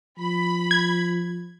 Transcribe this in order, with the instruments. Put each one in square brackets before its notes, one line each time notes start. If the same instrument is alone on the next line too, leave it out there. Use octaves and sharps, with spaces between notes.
[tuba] F3 [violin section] B5
[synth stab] G#6